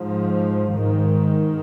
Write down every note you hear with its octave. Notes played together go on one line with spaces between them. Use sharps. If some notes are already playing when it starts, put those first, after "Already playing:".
Already playing: G#2 F3
G#2 D#3